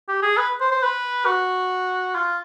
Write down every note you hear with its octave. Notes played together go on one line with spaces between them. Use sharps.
G4
G#4
B4
C5
C5
B4
F#4
F4